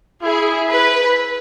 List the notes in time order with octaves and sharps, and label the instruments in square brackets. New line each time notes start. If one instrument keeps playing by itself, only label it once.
[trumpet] E4 [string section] G#4
[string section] B4